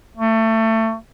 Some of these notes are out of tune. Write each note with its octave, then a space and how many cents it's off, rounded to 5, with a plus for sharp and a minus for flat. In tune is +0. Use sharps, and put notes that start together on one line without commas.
A3 +25